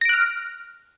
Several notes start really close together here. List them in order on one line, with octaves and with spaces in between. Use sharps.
A#6 D7 F#6 F6